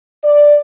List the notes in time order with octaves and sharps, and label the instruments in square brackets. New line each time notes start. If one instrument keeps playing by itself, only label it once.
[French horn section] D5